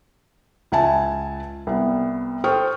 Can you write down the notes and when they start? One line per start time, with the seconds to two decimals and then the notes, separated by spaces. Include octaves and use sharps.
0.72 C#2 E5 G#5 A5
1.67 C2 B3
2.44 A4 C5 G5 C#6 D#6 F6